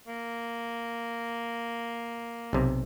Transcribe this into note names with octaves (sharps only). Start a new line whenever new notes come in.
A#3
B1 C3